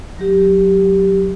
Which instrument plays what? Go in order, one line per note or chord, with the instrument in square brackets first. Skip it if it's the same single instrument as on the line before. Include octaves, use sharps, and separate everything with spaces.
[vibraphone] F#3 G4